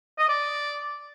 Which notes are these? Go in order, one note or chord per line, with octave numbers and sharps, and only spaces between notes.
D#5
D5